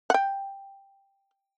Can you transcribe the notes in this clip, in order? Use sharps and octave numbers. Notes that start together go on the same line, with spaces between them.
F#5 G5